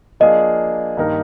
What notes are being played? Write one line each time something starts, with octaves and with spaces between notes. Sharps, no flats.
F3 A#3 D4 F4 G#4 D#5
G2 D#3 A#3 D#4 A#4